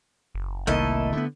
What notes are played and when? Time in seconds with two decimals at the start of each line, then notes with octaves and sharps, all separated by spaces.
0.35 F#1
0.67 C2 D#3 A3 A#3 E4 A4 D#5
1.13 D3 B3